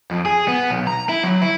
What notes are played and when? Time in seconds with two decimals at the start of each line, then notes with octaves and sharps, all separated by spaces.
0.11 F2
0.26 G#4
0.48 B3
0.70 B1
0.87 A#5
1.09 E4
1.23 F#3
1.41 E4